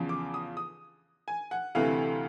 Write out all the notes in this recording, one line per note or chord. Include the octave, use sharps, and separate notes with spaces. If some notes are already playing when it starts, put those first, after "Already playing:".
Already playing: E2 C#3 F3
D6
D#6
D#6
G#5
F#5
D2 C3 E3 A3 F5